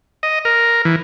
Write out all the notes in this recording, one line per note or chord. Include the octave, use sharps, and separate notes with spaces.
D#5
A#4
E3